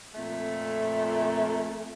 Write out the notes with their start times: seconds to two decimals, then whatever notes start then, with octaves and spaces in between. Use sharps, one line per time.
0.15 F2 A#2 A3